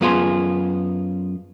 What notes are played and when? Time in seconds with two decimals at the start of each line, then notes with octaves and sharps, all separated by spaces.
0.01 F#2 B3 F4 G#4 C6